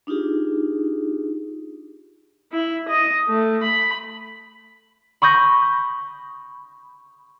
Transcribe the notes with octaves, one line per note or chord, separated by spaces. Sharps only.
D4 D#4 F4 G4 G#4
E4
D#5
A3
B5
B5 C#6 D#6 G6 A#6